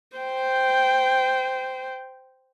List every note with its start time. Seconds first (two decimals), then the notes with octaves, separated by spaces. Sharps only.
0.17 C5 G5